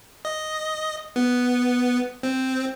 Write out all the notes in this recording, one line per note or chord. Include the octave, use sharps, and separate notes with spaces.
D#5
B3
C4